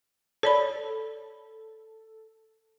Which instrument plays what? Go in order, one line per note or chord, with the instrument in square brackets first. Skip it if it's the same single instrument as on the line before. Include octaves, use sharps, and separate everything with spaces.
[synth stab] A4 [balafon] C#5 D5 B5